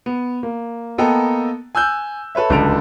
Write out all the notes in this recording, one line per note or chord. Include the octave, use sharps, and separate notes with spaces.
B3
A#3
A#3 B3 A4 D#5 G5 A#5
G#5 E6 F#6 G6
A4 B4 C#5 E5
D1 C#2 D3 A4 D7 F7